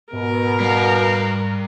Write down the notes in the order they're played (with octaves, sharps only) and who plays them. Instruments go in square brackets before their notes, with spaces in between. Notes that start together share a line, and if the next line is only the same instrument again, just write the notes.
[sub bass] G#2 [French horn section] B2 [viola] A#4
[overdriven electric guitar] G3 F5